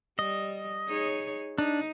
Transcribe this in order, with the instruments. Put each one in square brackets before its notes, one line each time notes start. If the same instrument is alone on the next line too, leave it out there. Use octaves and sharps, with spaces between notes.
[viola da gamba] G3 [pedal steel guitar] D#5
[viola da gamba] D#4 G#4 C#5
[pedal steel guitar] D4 [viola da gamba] D#4